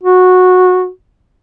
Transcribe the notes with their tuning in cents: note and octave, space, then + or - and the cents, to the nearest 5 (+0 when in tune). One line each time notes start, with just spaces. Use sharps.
F#4 -15